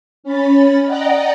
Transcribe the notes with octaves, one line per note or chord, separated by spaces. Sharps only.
C#4 B5 A6
D5 D#5 F#5 G5 A#5 A#6